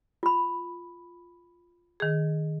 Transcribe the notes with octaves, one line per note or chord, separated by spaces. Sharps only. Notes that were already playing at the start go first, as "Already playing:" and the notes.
F4 B5
D#3 G#4